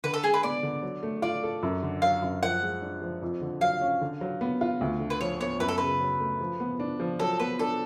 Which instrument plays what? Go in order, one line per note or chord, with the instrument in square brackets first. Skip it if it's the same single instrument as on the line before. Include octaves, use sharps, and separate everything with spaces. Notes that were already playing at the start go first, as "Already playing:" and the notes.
[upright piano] D3 [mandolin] B4
[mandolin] A4
[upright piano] G#3 [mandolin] G#4
[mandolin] B4
[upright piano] B3 [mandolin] D5
[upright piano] D3
F#3
A3
[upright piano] F4 [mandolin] D5
[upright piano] A4
F#2
D3
[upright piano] F#3 [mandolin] F5
[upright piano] F#2
[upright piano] F3 [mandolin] F#5
[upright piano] G#3
D4
F3
F2
D3
[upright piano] F#3 [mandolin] F5
[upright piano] C#4
D3
F#3
B3
F4
D2
D3
[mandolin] B4
[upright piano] F3 [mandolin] C#5
[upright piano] B3 [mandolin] C#5
[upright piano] F#2 [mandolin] B4
[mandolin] A4
[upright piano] C#3 [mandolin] B4
[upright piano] F#3
A3
F3
B3
D4
F3
[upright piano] F#3 [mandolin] A4
[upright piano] B3 [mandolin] B4
[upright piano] D4 [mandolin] A4